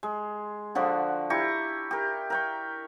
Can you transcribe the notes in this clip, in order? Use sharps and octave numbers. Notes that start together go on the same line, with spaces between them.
G#3
D3 F3 F#4 D5
E4 G4 A#5 C#6
G4 A#4
A#4 G5 C#6